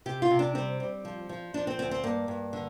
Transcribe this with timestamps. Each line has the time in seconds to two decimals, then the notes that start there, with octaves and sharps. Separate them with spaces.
0.06 C3 G4
0.22 F4
0.30 C3
0.39 D4
0.55 G3 C4
0.80 G3
1.05 F3
1.29 F3
1.54 F3 D4
1.67 C4
1.79 D2 C4
1.91 C4
2.04 G2 A#3
2.28 G2
2.53 D3